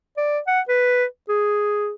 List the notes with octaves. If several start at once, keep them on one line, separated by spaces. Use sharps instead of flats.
D5
F#5
B4
G#4